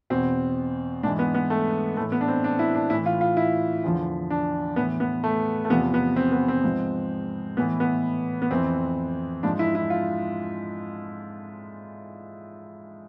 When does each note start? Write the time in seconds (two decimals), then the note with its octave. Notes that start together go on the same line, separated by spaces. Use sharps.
0.10 E2 B2 C4
1.03 G#2 D4
1.06 E3
1.19 B3
1.35 B3
1.50 A3
1.97 E3 A3
2.00 A2
2.12 B3
2.21 D4
2.28 C4
2.44 D4
2.59 E4
2.74 D4
2.90 A2 E3 E4
3.06 F4
3.21 F4
3.37 E4
3.84 E2 D3 F3
4.30 D4
4.76 A2 E3 B3
5.00 B3
5.24 A3
5.65 A3
5.70 E2 C3 F3 B3
5.94 B3
6.16 C4
6.32 B3
6.48 C4
6.63 G#2 F3
7.57 A2 B3
7.60 E3
7.80 B3
8.42 B3
8.50 F2 E3 C4
9.43 G#2 F3 D4
9.59 E4
9.75 E4
9.90 F4